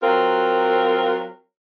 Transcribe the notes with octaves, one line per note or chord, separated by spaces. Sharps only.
F#3 C4 F4 A#4